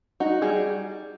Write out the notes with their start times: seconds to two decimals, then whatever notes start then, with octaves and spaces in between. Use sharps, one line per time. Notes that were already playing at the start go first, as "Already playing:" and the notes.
0.20 D#4 F#4
0.42 G3 G#4